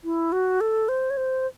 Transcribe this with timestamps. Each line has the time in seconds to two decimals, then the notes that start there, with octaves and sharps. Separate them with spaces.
0.04 E4
0.32 F#4
0.61 A4
0.89 C5
1.10 C#5
1.17 C5